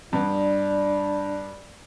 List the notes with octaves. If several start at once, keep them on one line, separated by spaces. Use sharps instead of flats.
G2 B3 D4